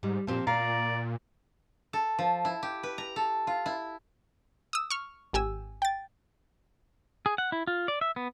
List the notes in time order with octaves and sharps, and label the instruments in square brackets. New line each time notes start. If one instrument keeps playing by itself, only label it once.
[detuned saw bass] G#2 [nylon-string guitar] G3
[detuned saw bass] A#2 [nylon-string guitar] F3 C4 G4
[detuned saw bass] A#2 [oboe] D5 [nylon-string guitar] F5 [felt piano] A#5
[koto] A4
F3
E4
G4
B4
A#5
A4
F4
E4
[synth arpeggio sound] D#6 E6
C#6 F6
G#1 G4 G#5 E6
G5 A6
[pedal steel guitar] G#4
F#5
E4
F4
D5
E5
B3